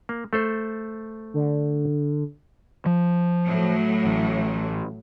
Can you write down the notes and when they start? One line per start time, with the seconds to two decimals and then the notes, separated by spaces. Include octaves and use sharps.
0.09 A#3
0.33 A3 A4 C5
1.34 D3
2.86 F3
3.47 A2 F#3
4.05 A1